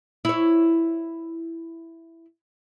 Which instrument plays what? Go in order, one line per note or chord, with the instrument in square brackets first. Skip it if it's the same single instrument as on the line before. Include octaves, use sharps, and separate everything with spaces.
[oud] E4 C#5